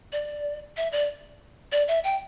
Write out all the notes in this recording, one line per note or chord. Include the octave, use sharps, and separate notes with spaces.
D5
E5
D5
D5
E5
G5